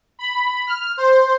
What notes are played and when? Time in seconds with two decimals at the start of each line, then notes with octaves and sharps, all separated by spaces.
0.19 B5
0.67 F6
0.97 C5